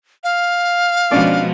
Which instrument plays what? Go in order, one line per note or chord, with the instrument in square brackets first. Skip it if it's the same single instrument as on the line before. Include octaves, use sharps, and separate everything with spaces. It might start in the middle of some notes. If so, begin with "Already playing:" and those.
[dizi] F5
[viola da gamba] B2 F3 G#3 [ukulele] C#4 D4 D5